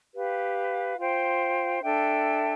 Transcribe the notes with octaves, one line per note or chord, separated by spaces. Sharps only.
G4 B4 F5
F4 C5 G5
D4 A4 E5 G5